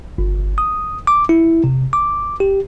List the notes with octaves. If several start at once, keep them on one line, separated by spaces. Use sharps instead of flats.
G1
D#6
D6
E4
C3
D6
G4